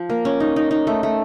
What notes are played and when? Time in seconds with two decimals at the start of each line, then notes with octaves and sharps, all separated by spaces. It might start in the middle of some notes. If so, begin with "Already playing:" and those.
Already playing: F3
0.10 A#3
0.25 C#4
0.40 D#4
0.56 D#4
0.71 D#4
0.87 A3
1.03 A3